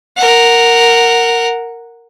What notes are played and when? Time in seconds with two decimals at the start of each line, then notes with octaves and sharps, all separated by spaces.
0.17 A#4 F#5